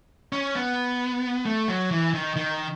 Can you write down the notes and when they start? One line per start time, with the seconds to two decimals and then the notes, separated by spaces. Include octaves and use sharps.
0.33 C#4
0.55 B3
1.46 A3
1.68 F#3
1.91 E3
2.14 D#3
2.36 D#3